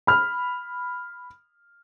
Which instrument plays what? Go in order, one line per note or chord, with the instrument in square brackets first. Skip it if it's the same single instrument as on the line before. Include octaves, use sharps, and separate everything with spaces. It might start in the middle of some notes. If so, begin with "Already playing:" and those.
[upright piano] B5 F6